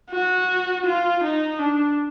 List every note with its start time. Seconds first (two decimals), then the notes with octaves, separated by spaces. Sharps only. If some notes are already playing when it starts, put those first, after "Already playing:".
0.11 F#4
0.86 F4
1.23 D#4
1.60 D4